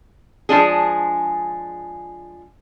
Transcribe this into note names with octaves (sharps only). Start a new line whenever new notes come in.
F3 G#3 D4 G#4